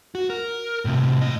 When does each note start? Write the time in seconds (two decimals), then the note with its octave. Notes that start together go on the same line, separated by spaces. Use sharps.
0.15 F#4
0.30 A#4
0.85 A2 C3
1.21 A2 D#5